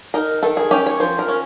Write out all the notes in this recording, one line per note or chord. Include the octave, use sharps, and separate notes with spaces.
D#4 A#4
D#3 A4
G#4
C#4 G4
C#5
F3 C5
A#4
C#4